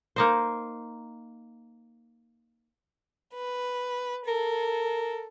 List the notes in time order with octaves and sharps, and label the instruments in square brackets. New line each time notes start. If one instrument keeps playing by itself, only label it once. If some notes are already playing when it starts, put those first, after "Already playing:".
[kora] A#3 D#4 C5
[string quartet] B4
[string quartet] A4 [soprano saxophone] A#4